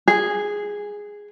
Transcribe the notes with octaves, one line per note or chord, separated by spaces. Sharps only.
G#4